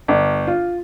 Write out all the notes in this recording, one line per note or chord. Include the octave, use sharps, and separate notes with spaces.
G1
F4